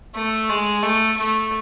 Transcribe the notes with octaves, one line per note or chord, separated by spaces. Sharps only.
A3
G#3
A3
A3